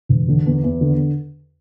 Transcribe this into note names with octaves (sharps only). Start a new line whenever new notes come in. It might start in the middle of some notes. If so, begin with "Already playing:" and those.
E1
D3
E2
E2
D3